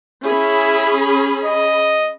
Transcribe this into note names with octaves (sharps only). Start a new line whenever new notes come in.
C#4 E4 G#4 B5
D#5